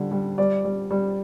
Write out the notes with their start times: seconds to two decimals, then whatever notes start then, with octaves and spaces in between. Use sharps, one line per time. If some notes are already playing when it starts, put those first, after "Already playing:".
Already playing: D3 G3
0.11 G3
0.38 G3 D5
0.64 G3
0.91 G3